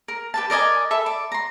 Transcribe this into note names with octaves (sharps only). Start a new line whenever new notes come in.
A#4
G4 B4 A5
A#4 D5 D#5 G#5
A4 E5 B5
D5
A#5 C6